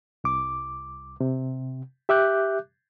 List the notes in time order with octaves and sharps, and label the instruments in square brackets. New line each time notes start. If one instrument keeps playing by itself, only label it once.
[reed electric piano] C2 D6
C3
G4 E5 D6 F#6 G6